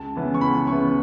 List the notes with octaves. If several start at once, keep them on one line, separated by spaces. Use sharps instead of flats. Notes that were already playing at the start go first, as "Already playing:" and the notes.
Already playing: C#2 A5
C#3 E3 B3
C#6
C#2 B5
C#3 E3 B3 C#6